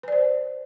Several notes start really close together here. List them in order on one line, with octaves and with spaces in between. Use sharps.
B4 D5 C5